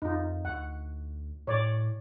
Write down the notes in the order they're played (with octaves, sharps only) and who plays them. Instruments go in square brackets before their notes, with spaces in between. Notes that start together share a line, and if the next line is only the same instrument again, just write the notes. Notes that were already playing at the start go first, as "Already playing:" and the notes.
[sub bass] F2 [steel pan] D#4 F4
[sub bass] D2 [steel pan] F#5
[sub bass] A2 [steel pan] C#5 D5